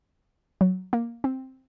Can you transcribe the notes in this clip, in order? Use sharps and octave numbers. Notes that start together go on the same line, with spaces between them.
F#3
A#3
C4